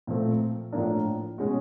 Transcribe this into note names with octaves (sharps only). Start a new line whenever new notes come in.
A#2 F3 A3 C4
A2 F3 A#3 D4
B2 G#3 C#4 F#4